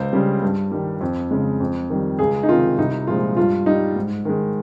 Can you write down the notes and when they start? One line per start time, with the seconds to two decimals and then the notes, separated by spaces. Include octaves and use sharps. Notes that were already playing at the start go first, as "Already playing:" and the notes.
Already playing: C#2 C5
0.13 C#3 G3
0.42 G2
0.72 D#3 G3
1.01 F2
1.31 C#3 G#3
1.60 F2
1.90 D#3 G3
2.19 C#2 G#4
2.43 D#4
2.49 C3 D#3 F4
2.78 C2 D#4
3.07 A#2 F3 G#3 F4
3.37 G2 F4
3.66 G3 D#4
3.96 G#2
4.25 D#3 G#3